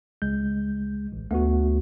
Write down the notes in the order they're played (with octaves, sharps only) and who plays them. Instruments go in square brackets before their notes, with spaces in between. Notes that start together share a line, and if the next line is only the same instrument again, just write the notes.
[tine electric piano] C#2 G#3 G6
A1
[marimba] D2 [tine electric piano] A3 B3 F#4